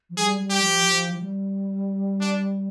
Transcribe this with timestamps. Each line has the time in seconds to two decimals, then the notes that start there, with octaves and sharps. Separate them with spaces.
0.10 F3
0.17 G3 G#4
0.39 G3
0.50 G4
0.62 F3
0.85 F3
1.11 F3
1.19 G3
2.21 D4